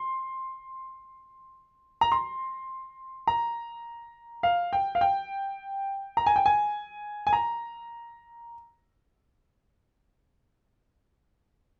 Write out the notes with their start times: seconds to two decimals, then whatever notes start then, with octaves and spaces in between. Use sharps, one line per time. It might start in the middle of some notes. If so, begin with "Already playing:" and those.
Already playing: C6
2.01 A#5
2.12 C6
3.27 A#5
4.43 F5
4.73 G5
4.95 F5
5.01 G5
6.17 A#5
6.26 G#5
6.36 G5
6.46 G#5
7.27 G#5
7.33 A#5